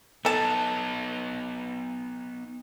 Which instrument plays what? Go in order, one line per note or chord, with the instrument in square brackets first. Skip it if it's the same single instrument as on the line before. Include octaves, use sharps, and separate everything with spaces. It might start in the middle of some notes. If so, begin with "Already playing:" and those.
[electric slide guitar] B3 D#4 [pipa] A4 A5